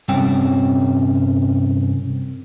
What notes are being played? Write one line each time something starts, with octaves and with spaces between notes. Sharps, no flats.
C2 G2 C4 C#4 G5